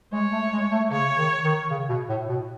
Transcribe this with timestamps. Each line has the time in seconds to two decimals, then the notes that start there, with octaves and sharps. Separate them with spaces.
0.12 G#3 C#5
0.32 A3
0.53 G#3
0.71 A3
0.91 C#3 C#5
1.18 D#3
1.44 D#3
1.70 C#3
1.89 B2
2.09 A2
2.29 B2